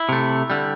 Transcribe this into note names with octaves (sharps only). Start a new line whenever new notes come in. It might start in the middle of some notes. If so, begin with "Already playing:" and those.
Already playing: E4
C3 A3
D3 G3